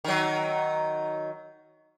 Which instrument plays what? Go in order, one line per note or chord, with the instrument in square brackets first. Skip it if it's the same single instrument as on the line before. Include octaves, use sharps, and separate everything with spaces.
[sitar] D#3 F#3